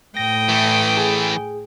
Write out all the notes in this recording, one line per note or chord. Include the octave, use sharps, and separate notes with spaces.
A2 G5 D#6 A#6
E3 A3
G#4